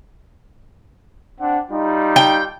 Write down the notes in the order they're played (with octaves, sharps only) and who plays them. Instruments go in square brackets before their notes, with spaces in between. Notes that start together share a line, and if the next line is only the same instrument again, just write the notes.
[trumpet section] C4 D4 F#5
G3 D#4 F4
[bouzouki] G5